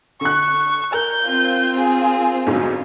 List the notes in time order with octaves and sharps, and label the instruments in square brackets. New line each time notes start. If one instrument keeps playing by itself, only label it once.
[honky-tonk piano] D3 F#6 [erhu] C#6
[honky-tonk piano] A#4 [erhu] G6
[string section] C4 F4
[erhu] G#4
[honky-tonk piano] G1 G#2 F#3